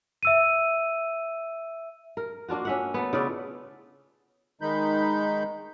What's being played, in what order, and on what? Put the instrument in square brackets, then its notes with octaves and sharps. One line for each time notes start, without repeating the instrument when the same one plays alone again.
[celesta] E5 E6 D#7
[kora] A#4
A#3 D4 F4 F#4
C#4 E5 F#5
A3 B3
C#3 E4 F4 D5
[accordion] D#3 G#3 D#4 B5 G6